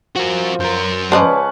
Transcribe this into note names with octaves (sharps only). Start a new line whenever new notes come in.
F3 F#4 A#4
F#2 A#4 C5
C#2 C#4 B4 C5 D5 D#5 A5